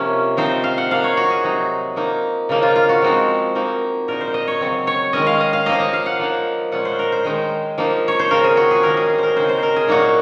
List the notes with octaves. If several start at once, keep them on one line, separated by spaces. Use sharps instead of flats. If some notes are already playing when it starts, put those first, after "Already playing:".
Already playing: C3 F3 A#3 C#4 D#4
F3 C4 D#4 C5
F5
F#5
F3 A#3 D#4 F5
C#5
F#4
G#4
C3 F#3 C4 D#4
F3 A#3 D#4
C#3 F3 A#3 D#4
F4
F4
F#4
F3 G#3 C4 D#4
F3 A#3 D#4
A#2 G#3 D#4 A#4
C5
D#5
C#5
C#3 F#3 C4
C#5
D#3 G#3 C#4 D#5
F5
D#5
F5
F3 A#3 D#4 D#5
D#5
F5
F#5
F3 A#3 D#4
A#2 F3 G#3 C#4 F#5
C5
A#4
C5
D#3 G#3 D#4
F3 A#3 D#4
C#5
C5
C#3 F3 C4 A#4
G#4
F#4
G#4
D#3 A#3 C#4 A#4
G#4
G#4
A#4 C5
C#3 G#3 C4 D#4 C5
C5
A#4
G#4
A#2 F#3 A#3 D#4 F#4